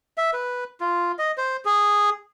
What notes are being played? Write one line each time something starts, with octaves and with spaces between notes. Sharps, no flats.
E5
B4
F4
D#5
C5
G#4